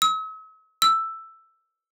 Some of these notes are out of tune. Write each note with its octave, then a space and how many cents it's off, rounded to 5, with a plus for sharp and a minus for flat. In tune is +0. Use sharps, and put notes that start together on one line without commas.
E6 -45
E6 +5